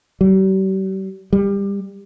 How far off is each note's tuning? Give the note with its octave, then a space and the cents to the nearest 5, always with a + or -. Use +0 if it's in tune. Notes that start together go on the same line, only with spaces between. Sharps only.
G3 -45
G3 +25